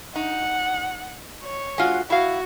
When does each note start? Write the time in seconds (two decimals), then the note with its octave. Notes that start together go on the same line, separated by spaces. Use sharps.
0.16 D#4 F#5
1.44 C#5
1.78 G#3 F4 F#4
2.10 E4 F#4 F5